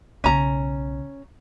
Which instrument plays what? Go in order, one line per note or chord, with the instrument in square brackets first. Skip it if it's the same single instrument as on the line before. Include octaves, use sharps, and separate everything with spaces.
[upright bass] B1 C#3 [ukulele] C#4 A#5